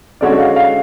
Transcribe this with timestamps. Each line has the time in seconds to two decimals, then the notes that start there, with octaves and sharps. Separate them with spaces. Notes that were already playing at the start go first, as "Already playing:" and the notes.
0.21 D3 G#3 C#4 F#4 C#5 D5
0.39 F5
0.56 F5